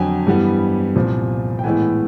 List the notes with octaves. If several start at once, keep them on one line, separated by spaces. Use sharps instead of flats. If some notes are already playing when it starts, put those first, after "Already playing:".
Already playing: F2 D3 F#3 G5 G#5
G2 E3 G3 B3
C2 A#2 F3
G5
A2 E3 G#3 B3 G#5